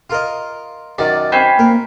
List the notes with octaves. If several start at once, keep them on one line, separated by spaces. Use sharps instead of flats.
F4 A#4 D#5
F#2 D#3 D5
C4 C#4 B4
A#3 A#4